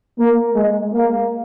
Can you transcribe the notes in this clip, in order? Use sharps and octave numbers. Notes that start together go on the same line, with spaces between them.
A#3
G#3
A#3